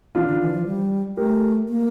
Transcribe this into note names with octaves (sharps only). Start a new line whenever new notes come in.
E3 D4 F4
D3
E3
F3
G3
A3 G4 A#4
A#3